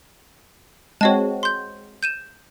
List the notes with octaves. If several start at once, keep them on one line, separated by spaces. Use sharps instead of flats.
G#3 C4 F#4 C#5 D#5 A5
C6 G6
G6 D#7 E7